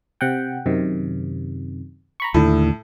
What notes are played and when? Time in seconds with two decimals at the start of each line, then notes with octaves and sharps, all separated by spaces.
0.21 C3 F#5 G5
0.66 F#2 C3 D#3
2.20 A#5 B5 C#6
2.34 D#2 A2 D3 A3 A4